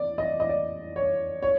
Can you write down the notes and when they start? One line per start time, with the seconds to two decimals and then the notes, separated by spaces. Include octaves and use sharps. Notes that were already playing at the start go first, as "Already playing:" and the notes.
Already playing: D5
0.18 D#5
0.40 D#5
0.49 D5
0.96 C#5
1.43 C#5